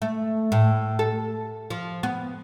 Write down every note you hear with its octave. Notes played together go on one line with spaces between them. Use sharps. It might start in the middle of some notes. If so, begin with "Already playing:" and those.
A3
A2
A4
F3
B3